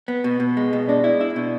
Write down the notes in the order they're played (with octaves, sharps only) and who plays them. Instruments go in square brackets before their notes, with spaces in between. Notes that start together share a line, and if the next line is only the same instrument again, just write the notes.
[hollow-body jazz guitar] B3
B2
B2
G#3
B2
[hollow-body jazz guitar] G#3 [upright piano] D4
[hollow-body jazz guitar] E4
E4
B2